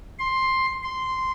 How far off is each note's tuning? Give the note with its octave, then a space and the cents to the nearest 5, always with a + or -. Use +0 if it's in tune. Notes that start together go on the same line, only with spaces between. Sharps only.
C6 +10
C6 -5